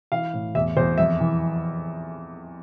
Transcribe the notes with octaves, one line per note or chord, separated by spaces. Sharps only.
E3 F5
A2
E2 E5
E2 C5
F2 E5
E3